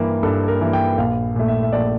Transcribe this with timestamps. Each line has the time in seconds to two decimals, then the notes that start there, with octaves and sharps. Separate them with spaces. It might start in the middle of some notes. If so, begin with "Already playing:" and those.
Already playing: G2 E3 A#3 G4
0.23 G2 A4
0.48 A#4
0.61 E3 A#3
0.73 G5
0.98 A#1 F5
1.35 A#2 A3
1.48 E5
1.63 E5
1.73 A#1 D5